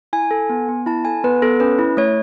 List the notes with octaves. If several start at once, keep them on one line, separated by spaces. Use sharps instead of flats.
E4 G#5
A4
B3
B3
E4 A5
A4 G#5
B3 B4
B3 A4
C#4 B4
E4
A3 C#5